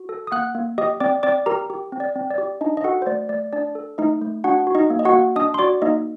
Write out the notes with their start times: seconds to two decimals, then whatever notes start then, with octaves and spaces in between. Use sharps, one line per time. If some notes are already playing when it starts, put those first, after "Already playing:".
Already playing: F#4
0.09 A4
0.27 D#6
0.32 A#3 F#5 F#6
0.55 A#3
0.78 G4 D#5 D#6
1.00 C4 D5 D6
1.23 C4 D5 D6
1.46 G4 A#4 A#5
1.70 G4
1.92 C4
2.00 D5
2.16 C4
2.30 D5
2.38 G4
2.61 D4 D#4 D#5
2.77 D#5
2.84 F#4 A4 F#5
3.02 C5
3.06 A3 D5
3.29 A3 D5
3.53 D4 D5
3.75 A4
3.98 A3 D#4 D#5
4.21 A3
4.44 D4 F#4 F#5
4.67 F#4
4.75 D#4 D#5
4.90 A#3
4.99 D#5
5.05 F#4 F#5
5.13 A#3
5.36 D4 D#5 D#6
5.54 C6
5.59 F#4 D5 D6
5.82 A#3 D#4 D#5